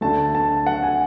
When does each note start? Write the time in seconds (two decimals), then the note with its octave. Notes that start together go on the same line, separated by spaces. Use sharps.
0.01 D2 D3 A3 A5
0.35 A5
0.66 F#5
0.83 G#5